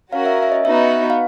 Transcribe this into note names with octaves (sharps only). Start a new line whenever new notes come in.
C#4 F#4 A#4 F5
E5
E5
D#5
B3 D#4 F#4 E5
F5